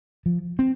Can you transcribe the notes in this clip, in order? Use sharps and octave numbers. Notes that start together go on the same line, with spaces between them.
F3
C4